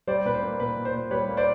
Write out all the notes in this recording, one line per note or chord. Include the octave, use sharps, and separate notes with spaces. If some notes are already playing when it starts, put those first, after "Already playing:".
G3 C5 D5
A#2 B4
C5
A#3
A#2 B4
A#2
C5
A#2
G3 B4 C#5
A#3
C5 D5